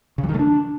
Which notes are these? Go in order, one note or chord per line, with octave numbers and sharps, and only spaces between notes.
C#3
F#3
D#3
A3
D4